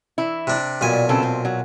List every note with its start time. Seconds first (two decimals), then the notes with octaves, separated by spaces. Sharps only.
0.18 E3 E4
0.47 C3 D4
0.81 B1 A#2 G3 G#5
1.09 C#3 C4 A4
1.23 C4
1.45 F#3